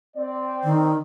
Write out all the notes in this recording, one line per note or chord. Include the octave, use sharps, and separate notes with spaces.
C4 D5
D#3